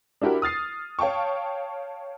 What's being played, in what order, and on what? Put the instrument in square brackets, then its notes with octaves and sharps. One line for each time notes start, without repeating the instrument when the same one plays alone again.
[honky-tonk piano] D4 E4 F#4 G4 A#4
D#6 F6 A6 C7
C#5 F5 G5 A5 C#6